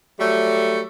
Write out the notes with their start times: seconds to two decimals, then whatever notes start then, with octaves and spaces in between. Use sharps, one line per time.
0.20 F#3 G3 A3